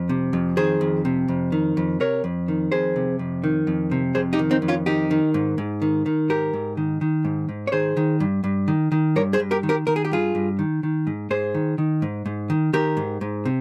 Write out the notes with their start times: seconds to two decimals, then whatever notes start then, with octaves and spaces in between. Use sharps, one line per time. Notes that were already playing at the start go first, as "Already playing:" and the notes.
Already playing: F2
0.09 C3
0.33 F2
0.57 D#3 G#4 C5
0.81 F2
1.05 C3
1.28 F2
1.52 D#3
1.77 F2
2.00 C3 A#4 C#5
2.24 F2
2.48 D#3
2.72 F2 G#4 C5
2.96 C3
3.19 F2
3.44 D#3
3.67 F2
3.91 C3
4.15 F2 G#4 C5
4.33 D#4 G4
4.39 D#3
4.51 C4 D#4
4.62 F2
4.68 C#4 F4
4.86 D#3 D#4 G4
5.11 D#3
5.34 G#2
5.58 G#2
5.82 D#3
6.06 D#3
6.29 G#2 G4 A#4
6.53 G#2
6.77 D#3
7.01 D#3
7.25 G#2
7.49 G#2
7.67 C#5
7.72 D#3 G#4 C5
7.97 D#3
8.20 G2
8.44 G2
8.68 D#3
8.92 D#3
9.16 G2 A#4 C#5
9.33 G#4 C5
9.40 G2
9.51 G4 A#4
9.63 D#3
9.69 G4 A#4
9.87 D#3 A#4
9.96 G#4
10.05 G4
10.11 G2 F4 G#4
10.35 G2
10.59 D#3
10.83 D#3
11.07 G#2
11.30 G#2 G#4 C5
11.54 D#3
11.78 D#3
12.02 G#2
12.26 G#2
12.50 D#3
12.73 D#3 G4 A#4
12.97 G#2
13.21 G#2
13.45 C3